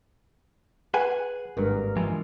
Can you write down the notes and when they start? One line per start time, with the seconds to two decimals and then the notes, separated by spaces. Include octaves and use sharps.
0.94 G#4 B4 F#5 G#5
1.57 G#1 G2 A#4
1.97 E3 F3 G#3